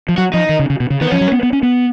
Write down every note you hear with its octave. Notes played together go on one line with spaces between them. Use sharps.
F3
F#3 F#4
F3 D#4
D#3
C#3
C#3
B2
C#3
D#3 B3
F3 C#4
F#3
B3
B3
C#4
B3